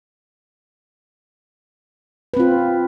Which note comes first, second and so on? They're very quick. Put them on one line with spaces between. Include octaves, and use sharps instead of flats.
B4 C4 F4